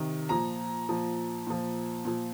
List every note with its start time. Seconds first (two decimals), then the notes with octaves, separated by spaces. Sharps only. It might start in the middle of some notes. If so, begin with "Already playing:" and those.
Already playing: C3 D#3
0.29 A#2 F3 A#5
0.89 A#2 F3
1.47 A#2 F3
2.05 A#2 F3